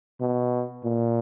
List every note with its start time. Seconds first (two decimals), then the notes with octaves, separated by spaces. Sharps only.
0.21 B2
0.84 A#2